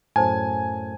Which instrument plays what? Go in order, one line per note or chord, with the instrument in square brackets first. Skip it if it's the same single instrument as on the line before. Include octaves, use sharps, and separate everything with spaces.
[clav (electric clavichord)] F#2 A2 [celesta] C5 A5 [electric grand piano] G#5